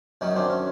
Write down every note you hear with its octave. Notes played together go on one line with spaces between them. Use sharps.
F#2 D#3 F#3 C#4 D#4
C4 D4
C#4